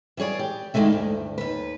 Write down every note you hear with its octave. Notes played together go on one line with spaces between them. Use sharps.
E3 G3 G#4 C#5 D5
G4
D#3 E3 G#3 A3 E4
D2 G2
D#2 B4